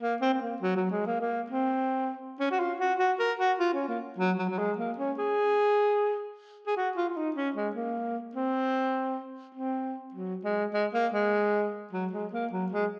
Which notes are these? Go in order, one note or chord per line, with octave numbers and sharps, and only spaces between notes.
A#3
C4
C4
A#3
F#3
F#3
G#3
A#3
A#3
C4
C#4
F#4
F4
F#4
F#4
A#4
F#4
F4
C#4
A#3
F#3
F#3
F#3
G#3
A#3
C#4
G#4
G#4
F#4
F4
F4
D#4
C#4
G#3
A#3
C4
C4
F#3
G#3
G#3
A#3
G#3
F#3
G#3
A#3
F#3
G#3